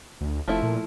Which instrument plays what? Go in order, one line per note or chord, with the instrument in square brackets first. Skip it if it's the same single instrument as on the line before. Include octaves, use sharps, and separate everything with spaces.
[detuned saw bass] D2
[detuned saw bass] F1 [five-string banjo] F3 A3 E4
[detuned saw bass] A#2